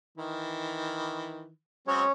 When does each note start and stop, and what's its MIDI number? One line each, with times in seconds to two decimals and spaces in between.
0.18 1.50 51
0.18 1.50 52
1.88 2.03 54
1.88 2.03 56
1.88 2.03 60
1.88 2.12 61
1.88 2.12 73